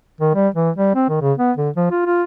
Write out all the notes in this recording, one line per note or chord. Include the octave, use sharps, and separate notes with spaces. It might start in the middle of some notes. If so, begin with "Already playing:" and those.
D#3
G3
E3
G3
C4
D#3
C#3
B3
D3
F3
F4
F4